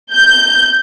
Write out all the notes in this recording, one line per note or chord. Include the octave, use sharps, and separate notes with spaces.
G6